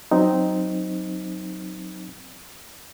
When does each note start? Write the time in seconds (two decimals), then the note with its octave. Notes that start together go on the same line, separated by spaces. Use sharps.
0.11 F#3 C4 D#4